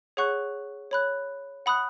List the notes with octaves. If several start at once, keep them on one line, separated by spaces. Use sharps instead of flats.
G#4 C#5 F#5 C#6 F#6
C#5 B5 F#6
F#5 B5 D#6 F#6